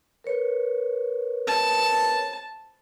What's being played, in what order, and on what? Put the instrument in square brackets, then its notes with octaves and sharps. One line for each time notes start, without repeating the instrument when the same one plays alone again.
[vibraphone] A#4 B4 C#5
[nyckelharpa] A5